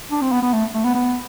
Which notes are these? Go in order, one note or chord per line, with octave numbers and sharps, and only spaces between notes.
D4
C4
B3
B3
A3
A3
B3
B3